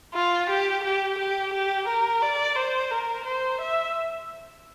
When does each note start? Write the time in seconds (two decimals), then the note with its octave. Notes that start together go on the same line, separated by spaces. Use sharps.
0.14 F4
0.49 G4
0.84 G4
1.18 G4
1.53 G4
1.88 A#4
2.22 D5
2.56 C5
2.91 A#4
3.25 C5
3.61 E5